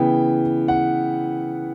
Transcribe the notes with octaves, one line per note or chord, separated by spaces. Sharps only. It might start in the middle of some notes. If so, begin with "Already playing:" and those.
Already playing: C#3 E3 B3 G5
F#5